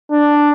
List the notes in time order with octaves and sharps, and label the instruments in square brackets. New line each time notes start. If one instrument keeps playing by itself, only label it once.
[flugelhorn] D4